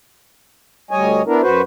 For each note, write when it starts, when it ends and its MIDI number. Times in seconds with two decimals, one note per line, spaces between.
0.91 1.22 38
0.91 1.22 55
0.91 1.22 73
0.91 1.22 75
0.91 1.22 80
1.26 1.41 59
1.26 1.41 62
1.26 1.41 64
1.26 1.41 70
1.41 1.62 42
1.41 1.62 66
1.41 1.62 71
1.41 1.62 72